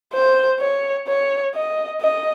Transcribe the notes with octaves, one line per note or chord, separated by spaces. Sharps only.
C5
C#5
C#5
D#5
D#5